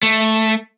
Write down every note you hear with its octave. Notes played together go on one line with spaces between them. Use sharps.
A3